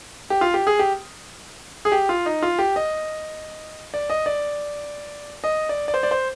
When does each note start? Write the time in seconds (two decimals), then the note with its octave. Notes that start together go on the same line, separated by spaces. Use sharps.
0.30 G4
0.41 F4
0.54 G4
0.67 G#4
0.79 G4
1.85 G#4
1.92 G4
2.09 F4
2.26 D#4
2.43 F4
2.59 G4
2.76 D#5
3.94 D5
4.10 D#5
4.26 D5
5.44 D#5
5.69 D5
5.88 D5
5.94 C5
6.03 D5
6.11 C5